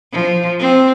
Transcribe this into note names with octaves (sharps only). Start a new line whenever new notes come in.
F3
C4